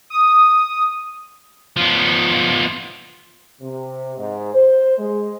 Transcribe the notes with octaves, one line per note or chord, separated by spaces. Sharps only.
D#6
F3 B3
C3
G#2
C5
G#3